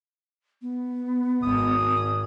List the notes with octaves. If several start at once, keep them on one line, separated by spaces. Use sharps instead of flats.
B3
G#1 G#2 D#6